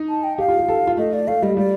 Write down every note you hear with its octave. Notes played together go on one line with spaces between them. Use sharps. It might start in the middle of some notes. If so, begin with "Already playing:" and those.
Already playing: D#4
A5
G5
G4 F5
F4
G4
A4
F4
A3 D#5
D5
A3 F5
G3 D#5
G3 D5